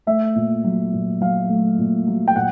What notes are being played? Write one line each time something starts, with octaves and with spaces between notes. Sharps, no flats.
A3 E5
A#2
F#3
A#2
F#3 F5
A3
A#2
F#3
G5
A#2 F#5